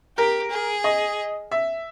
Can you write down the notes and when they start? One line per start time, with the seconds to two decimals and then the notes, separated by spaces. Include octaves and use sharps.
0.18 G4 A#4
0.50 G#4
0.84 D#5
1.51 E5